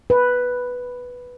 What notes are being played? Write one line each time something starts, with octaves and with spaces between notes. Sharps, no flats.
B4